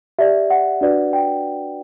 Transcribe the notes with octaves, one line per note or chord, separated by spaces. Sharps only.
G4 D5 E5
F#5
D4 F#4 B4 D5
G5